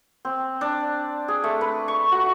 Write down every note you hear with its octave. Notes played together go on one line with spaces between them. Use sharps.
C4
D4
G#4
A3
B4
C#6
F#4